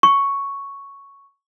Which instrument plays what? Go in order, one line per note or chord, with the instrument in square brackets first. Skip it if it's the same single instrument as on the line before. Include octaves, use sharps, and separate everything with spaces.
[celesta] C#6